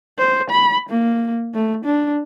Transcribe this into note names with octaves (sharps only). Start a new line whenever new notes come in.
C5
B5
A#3
A3
D4